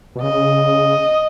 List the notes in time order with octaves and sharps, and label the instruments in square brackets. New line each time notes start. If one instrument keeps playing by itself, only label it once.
[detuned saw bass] B2
[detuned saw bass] C#3 [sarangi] D#5